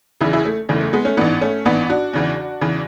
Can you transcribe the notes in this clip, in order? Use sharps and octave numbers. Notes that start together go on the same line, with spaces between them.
F#1 E2 C#3 E3 E4 G#4
E4 G#4
A3
F#1 E2 C#3 E3 A3
A3
G#3 B3
A3 C#4
A1 G#2 E3 B3 D4
A3 C#4
A1 G#2 E3 B3 D4
D4 F#4
E2 C#3 E3
E2 C#3 E3